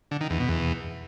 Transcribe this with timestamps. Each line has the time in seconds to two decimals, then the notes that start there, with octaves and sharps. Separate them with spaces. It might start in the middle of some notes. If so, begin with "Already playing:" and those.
0.11 D3
0.21 D#3
0.30 E2
0.39 B2
0.49 E2